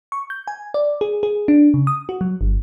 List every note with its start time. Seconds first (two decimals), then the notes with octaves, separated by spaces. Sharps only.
0.12 C#6
0.30 G6
0.48 G#5
0.74 D5
1.01 G#4
1.23 G#4
1.48 D4
1.74 C#3
1.87 D#6
2.09 F#4
2.21 F#3
2.41 G1